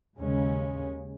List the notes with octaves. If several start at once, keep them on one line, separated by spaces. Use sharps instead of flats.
D#2 C#3 G#3 C#4